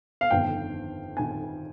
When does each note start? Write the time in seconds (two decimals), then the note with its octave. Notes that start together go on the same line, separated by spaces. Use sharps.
0.21 F5
0.30 G1 F2 D#3 G5
1.17 D#3 G#5